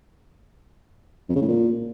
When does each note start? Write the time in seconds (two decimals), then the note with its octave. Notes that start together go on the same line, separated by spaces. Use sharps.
1.29 F2
1.35 C#3
1.42 A2
1.48 A#2